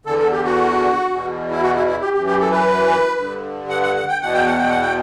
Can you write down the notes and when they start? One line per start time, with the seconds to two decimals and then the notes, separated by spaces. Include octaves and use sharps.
0.06 E2 D3 A4
0.19 A4
0.32 G4
0.44 F#4
1.10 E2 B2
1.51 E4
1.62 F#4
1.75 E4
1.87 E4
2.01 G4
2.13 F#2 E3 G4
2.26 G4
2.40 A4
2.52 B4
3.17 G2 D3
3.69 F#5
3.83 F#5
3.96 F#5
4.08 G5
4.22 E2 B2 F#5
4.34 G5
4.46 F#5
4.58 G5
4.69 F#5
4.81 G5